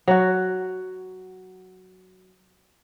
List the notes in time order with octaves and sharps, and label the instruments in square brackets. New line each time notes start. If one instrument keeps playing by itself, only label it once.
[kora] F#3 F#4